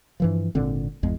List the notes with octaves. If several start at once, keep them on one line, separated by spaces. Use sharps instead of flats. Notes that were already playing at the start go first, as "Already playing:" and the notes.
G2 E3 F3
G#1 A#2 D3 C4
G#1 E2 G#3